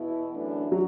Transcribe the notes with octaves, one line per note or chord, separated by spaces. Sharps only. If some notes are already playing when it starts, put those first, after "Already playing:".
Already playing: E2 B2 E4
F#2 E3 A3 D4
F#3